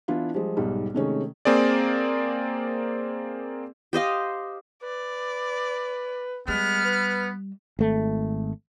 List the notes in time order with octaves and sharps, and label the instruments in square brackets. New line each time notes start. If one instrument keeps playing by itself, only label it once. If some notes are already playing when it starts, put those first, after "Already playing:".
[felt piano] E3 B3 D4 E4 F4
F3 G3 G#3
B1 G#2 G3
C3 D#3 G#3 A3 C#4
[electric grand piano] A#3 C4 G#4 D5
[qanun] G4 C5 D#5 F5
[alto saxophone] B4 [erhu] D5
[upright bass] G3 [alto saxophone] G#3 [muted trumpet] B3 [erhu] F6
[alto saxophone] B4
[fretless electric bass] G#1 A3